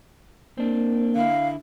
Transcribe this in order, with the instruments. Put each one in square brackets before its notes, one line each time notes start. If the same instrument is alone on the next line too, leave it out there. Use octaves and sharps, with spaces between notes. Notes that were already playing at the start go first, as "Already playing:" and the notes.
[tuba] A#3 [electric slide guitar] C4 D4
[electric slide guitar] D3 E4 [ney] F5